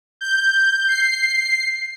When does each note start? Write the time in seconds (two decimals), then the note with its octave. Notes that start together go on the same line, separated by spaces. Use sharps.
0.21 G6
0.89 C7